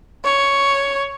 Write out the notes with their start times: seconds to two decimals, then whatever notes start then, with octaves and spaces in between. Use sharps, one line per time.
0.25 C#5